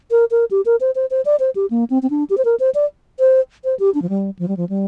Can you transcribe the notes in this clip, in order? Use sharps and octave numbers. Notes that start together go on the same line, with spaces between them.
A#4
A#4
G4
A#4
C5
C5
C5
D5
C5
G4
A#3
C4
C4
D4
G4
C5
A#4
C5
D5
C5
C5
G4
D4
F3
G3
F3
G3
F3
G3